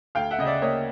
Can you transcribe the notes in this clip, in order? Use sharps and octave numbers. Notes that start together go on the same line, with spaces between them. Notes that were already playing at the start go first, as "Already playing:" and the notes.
D2 F5 G5
E5 F#5
C#3 D#5
D5 E5
A#3 C#5 D#5